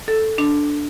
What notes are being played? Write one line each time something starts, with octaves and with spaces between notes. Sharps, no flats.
A4
D4